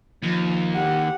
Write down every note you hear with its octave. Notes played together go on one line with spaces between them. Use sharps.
D#2 F3
G4 F#5